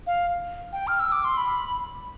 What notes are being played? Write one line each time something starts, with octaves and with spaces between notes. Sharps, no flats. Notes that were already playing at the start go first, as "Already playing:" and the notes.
F5
G5
F6
E6
D6
C6
B5